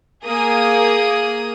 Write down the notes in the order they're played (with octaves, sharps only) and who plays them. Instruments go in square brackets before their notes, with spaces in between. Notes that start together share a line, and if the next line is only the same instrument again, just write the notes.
[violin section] A#3 G#4 D#6